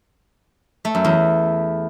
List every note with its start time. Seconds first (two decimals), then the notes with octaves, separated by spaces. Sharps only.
0.85 A3
0.95 F#2
1.05 E2